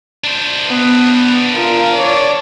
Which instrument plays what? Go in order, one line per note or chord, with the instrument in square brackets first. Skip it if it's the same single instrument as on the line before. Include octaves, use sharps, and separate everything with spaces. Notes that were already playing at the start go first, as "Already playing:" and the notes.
[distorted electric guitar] D4 C5
[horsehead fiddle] B3
F4 A#4
C#5 D5